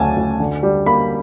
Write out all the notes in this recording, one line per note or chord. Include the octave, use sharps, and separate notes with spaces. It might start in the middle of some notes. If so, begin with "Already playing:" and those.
Already playing: D2 C#3 F#3 G#5 A5
D2
D3
G3
A#3 B5